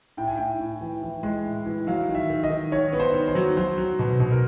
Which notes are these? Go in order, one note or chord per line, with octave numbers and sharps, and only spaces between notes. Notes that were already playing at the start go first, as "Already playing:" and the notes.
A2 G5
G#5
A2 G5
A2
E3
E3
G#3
A2
E3
F#3 F5
D#3
E5
D#3
D#5
D#3
D#3 C#5
B3
C5
D#3
C5
F#3
F#3 C5
F#3
B2
B2
A#4